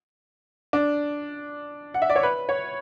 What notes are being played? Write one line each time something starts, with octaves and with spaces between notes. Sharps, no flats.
D4
F#5
E5
D5
C#5
B4
C#5